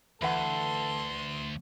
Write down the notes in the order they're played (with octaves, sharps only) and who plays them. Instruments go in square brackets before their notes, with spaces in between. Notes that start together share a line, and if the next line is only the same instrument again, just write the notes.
[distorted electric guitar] D2 [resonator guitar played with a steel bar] E3 B4 F#5 [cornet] A4 [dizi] C6